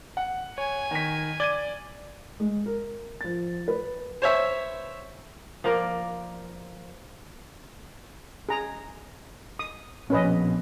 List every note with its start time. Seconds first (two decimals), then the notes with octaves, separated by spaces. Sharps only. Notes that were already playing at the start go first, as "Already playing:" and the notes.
0.17 F#5
0.58 C#5 G#5
0.91 D#3 B6
1.40 D5 G#6 D#7 G7
2.40 G#3
2.66 A#4
3.21 F3 A6
3.68 B4
4.22 C5 C#5 E5
5.64 F3 A#3 A#4 D5
8.49 G#4 A#5
9.59 D#6
10.10 A#1 B2 C#4 B4 D#5